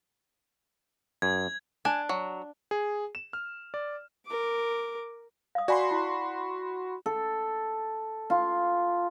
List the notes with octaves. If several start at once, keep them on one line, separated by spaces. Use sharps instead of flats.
F#2 G#6
D4 G#5
F#3
G#4
E7
F6
D5
A#4 D6
F5 D#6
F#4 D5 G#5 B5 C6
E4
A4
F4